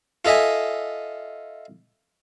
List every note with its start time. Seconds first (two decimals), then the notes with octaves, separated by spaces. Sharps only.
0.25 F4 A4 D#5 E5 G#5